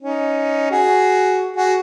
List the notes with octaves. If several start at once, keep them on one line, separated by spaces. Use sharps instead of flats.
C#4 D#4
F#4 G#4
F#4 G#4